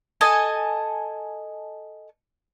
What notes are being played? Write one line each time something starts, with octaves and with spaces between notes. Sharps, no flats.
A4 D#5 G#5 A5